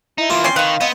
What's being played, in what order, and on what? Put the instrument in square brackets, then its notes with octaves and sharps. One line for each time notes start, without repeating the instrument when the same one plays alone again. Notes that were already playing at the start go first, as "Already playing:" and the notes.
[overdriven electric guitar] D#4 [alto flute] E4
[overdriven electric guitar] E3 A#3 [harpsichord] F4
[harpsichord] C4 [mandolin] C#4 D5 C6
[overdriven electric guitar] D#3 [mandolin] B4 C#6 [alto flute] F5
[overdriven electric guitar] B3 [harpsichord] C4 [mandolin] D#5